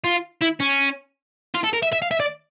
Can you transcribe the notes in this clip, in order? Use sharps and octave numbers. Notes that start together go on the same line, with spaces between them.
F4
E4
C#4
F4
A4
A#4
E5
E5
F5
E5
D5